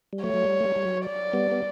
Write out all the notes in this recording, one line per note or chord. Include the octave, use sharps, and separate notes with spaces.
G3
F#3 A3 C#5
F#3
G3
A3
G3
G3
F#3
D5
G3 B3
B3